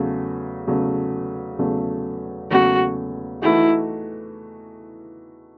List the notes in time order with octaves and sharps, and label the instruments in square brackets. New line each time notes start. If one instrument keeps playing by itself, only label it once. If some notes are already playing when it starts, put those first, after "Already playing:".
Already playing: [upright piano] E2 C#3 F#3 A3
E2 C#3 F#3 A3
E2 C#3 F#3 A3
[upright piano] E2 C#3 F#3 A3 [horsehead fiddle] F#4
[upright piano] E3 A3 D#4 F#4 [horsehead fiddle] E4